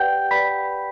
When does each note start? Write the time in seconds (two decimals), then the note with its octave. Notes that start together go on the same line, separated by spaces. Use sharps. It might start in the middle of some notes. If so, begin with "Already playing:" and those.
Already playing: G4 B4 D5 F#5 G5 G6
0.31 G4 B4 D5 B5 B6